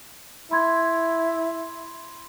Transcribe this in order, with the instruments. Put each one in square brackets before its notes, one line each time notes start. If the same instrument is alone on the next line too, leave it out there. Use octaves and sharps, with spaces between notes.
[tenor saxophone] E4 [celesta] B5 C6 G#6